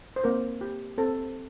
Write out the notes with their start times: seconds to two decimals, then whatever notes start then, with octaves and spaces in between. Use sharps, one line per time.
0.16 C5
0.24 A#3 C4 A#4
0.61 G4
0.98 C4 A4